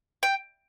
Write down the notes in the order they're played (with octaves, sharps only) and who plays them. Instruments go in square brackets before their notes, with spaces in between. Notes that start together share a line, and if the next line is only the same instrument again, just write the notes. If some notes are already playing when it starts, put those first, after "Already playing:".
[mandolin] G5